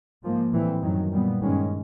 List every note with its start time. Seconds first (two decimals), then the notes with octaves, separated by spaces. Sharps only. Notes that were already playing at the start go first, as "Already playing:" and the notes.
0.22 G#2 F3 A#3
0.53 A2 E3 G3 C4
0.82 F#2 D#3 F#3
1.12 A#2 G3 B3
1.41 G2 D#3 G#3 C#4